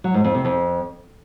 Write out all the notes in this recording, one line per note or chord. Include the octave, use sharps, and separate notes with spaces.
F#3
G#2
F2
C3
F2